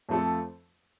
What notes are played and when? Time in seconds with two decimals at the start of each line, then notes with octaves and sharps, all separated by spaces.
0.09 F2 F3 A3 C4 A4